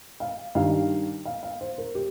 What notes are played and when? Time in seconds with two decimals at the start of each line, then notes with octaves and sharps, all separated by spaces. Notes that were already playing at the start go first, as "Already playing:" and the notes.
0.20 F5
0.55 G2 D#3 G3 F5
1.25 F5
1.43 F5
1.61 C5
1.78 A#4
1.95 G4